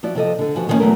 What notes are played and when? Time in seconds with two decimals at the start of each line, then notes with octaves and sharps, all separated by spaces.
0.03 F3 E4 F#4 D5
0.15 C3 F3 A4 D#5
0.39 D3 A4
0.55 E3 F3 F#4 G4
0.68 D3 D#3 F3 G3 A#3 C#4
0.80 E2 F#3 A3 A#4